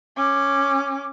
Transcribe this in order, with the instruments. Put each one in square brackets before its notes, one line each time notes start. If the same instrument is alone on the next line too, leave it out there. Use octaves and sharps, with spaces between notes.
[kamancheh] C#4 D6